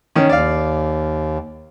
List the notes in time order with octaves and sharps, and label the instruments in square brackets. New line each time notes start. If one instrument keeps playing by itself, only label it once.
[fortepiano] D#3 C#4
[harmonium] D#2 [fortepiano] D5 F5